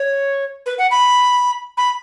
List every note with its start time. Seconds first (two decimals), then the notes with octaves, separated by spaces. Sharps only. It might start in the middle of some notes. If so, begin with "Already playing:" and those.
Already playing: C#5
0.66 B4
0.78 F#5
0.91 B5
1.77 B5